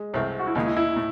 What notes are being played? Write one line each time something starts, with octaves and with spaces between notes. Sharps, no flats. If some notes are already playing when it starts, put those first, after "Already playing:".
Already playing: G#3
C2 C3 E3 A3 C4
F#4
E4
D#2 C#3 G#3 D#4
E4
E4
A2